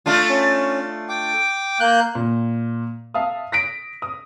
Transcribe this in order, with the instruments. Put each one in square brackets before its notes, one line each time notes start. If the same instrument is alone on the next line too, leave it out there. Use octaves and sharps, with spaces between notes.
[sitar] A3 D4 F4
[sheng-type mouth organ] C#4
G5 D6
A#3 F#6 G6
[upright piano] A#2
E5 F5 A5 D#6
A#6 B6 D7
D#6